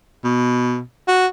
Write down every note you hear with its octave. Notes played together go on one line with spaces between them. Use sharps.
B2
F#4